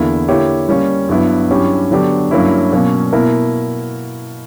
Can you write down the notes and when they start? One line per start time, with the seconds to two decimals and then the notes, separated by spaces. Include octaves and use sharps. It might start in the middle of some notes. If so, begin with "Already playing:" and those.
Already playing: E2 D3 A#3 E4
0.28 D3 A#3 E4 G4 C#5
0.69 G3 A#3 C#4
1.09 G2 F#3 B3 E4
1.50 G2 F#3 C#4 E4 G4
1.91 D3 F#3 B3 D4 G4
2.31 G2 F#3 A#3 C#4 E4
2.72 B2 F#3 A#3 C#4
3.13 B2 A#3 E4 A#4